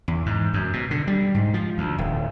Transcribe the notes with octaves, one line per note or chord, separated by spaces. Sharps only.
E2
G#2
F#2
B2
D3
G3
G#2
F3
D2
D1